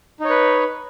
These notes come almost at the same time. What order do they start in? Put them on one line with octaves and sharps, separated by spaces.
D#4 C#5 B4